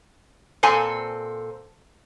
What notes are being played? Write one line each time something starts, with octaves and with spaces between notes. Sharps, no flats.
A#2 C4 A4 G#5